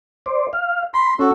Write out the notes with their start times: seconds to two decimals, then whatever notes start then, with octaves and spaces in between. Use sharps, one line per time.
0.26 C5 D5
0.53 F5
0.94 B5 C6
1.19 C#4 F#4 A4